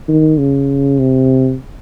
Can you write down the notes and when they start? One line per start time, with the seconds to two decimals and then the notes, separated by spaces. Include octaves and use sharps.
0.08 D#3
0.38 C#3
0.99 C3